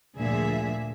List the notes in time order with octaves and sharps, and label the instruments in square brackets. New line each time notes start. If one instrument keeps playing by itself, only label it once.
[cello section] D2 A#2 D3 F3 G#4 E5